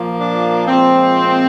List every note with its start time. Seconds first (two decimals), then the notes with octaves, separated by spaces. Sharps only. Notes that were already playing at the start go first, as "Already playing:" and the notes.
Already playing: A#2 F3 A#3
0.18 D4
0.67 A#2 F3 G#3 C4